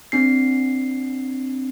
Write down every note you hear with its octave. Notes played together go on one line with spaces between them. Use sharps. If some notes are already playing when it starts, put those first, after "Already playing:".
C4 D4 C7